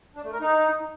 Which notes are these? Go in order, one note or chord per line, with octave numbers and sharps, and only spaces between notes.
D4
A3
A#4
D#4